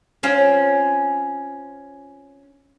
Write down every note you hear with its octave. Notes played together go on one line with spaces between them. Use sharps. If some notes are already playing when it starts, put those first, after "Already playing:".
C4 C#4 F4